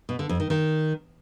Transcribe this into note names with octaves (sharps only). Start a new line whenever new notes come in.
B2
D3
F2
D#3
D#3